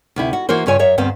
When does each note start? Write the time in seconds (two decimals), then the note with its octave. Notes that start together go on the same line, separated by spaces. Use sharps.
0.16 D2 C3 E4
0.33 F#4
0.49 E3 A#3 F#4 A#4 C5
0.66 G2 C#3 F4 C#5 G#5
0.79 F#2 C#5 E5
0.98 D2 G2 B3 C4 C5 F5